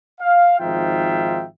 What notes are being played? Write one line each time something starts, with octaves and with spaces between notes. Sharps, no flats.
F5
G#1 F3 D#4 F4 E5 G5